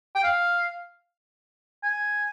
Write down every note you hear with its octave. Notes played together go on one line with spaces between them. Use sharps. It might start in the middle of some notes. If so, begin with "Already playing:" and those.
G5
F5
G#5